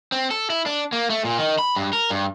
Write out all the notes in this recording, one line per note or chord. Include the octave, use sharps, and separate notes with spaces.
C4
A4
E4
D4
A#3
A3
A#2
D#3
B5
G2
A#4
G2